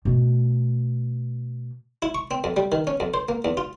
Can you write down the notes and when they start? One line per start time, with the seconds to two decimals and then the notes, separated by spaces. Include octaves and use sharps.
0.05 B2 A3
2.02 E4
2.15 C#6
2.31 C4
2.44 F2
2.57 G3
2.72 D#3
2.87 C#4
3.00 F2
3.14 C5
3.29 A#3
3.45 E2
3.57 F4